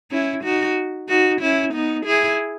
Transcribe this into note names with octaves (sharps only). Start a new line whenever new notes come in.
C#4 E4
D#4 F#4
D#4 F#4
C#4 E4
B3 D#4
E4 G#4